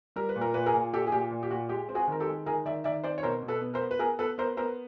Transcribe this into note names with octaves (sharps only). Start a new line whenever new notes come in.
G3 A#4
B4
A#2
A#4
A#2 B4
G#4 A#4
A#2
A#2 G4 A4
G#4
A#2 G4
A#2
G4
A#2 F#4
G#3 G4
C4
F#4 G#4
D#3 A#4
G4 A4
G#3
D#3 G#4 A#4
D#3 D5 E5
D#3 D5 E5
C4 C5 D5
C#5
B2 A#4 C5
B2
A4 B4
B3
A#4 C5
B3
B4
B3 G#4 A#4
B3 A4 B4
B3 A#4 C5
B3 A#4 C5